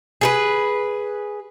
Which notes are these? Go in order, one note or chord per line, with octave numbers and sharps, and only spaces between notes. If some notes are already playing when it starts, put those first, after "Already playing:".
G#4 A4 B4